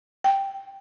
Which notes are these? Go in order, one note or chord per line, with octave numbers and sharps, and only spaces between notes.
G5